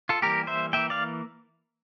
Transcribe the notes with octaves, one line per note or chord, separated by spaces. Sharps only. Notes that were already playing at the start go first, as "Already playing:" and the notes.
F4 A4
E3 G3 A#3 G4 A#4
C5 E5
E3 A#3 E5 G5
D5 F5